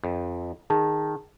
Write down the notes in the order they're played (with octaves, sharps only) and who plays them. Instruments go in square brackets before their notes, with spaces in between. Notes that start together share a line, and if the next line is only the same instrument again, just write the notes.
[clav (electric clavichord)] F2
[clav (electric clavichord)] D#3 [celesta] G#4 A5